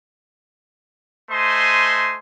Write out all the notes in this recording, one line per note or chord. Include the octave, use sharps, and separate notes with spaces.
A3 C5 D#5 G#5 C6